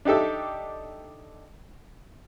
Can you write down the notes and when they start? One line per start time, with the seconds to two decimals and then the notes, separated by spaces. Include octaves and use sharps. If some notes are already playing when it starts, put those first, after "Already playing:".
0.05 D4 D#4 G4 A4 E5